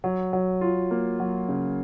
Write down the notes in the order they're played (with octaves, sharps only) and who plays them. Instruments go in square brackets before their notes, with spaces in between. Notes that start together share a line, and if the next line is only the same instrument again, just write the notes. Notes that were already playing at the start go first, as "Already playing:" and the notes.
[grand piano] F#3
F#3
F4
A#3
F#3
C#3